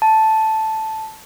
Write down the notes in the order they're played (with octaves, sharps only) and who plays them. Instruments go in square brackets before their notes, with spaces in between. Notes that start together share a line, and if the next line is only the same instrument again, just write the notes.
[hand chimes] A5